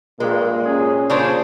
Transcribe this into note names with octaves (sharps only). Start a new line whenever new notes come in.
A#1 G2 A#2 G#3 A#4
C3 C#4 G#4
A#2 C#3 G3 C4 D4 G#4 C5